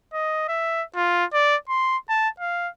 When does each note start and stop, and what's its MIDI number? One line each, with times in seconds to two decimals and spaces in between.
0.13 0.44 75
0.49 0.84 76
0.96 1.25 65
1.34 1.56 74
1.69 1.97 84
2.09 2.29 81
2.40 2.69 77